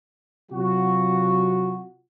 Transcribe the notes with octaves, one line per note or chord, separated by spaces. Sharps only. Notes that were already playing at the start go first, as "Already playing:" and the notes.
C3 F#3 F4 F#4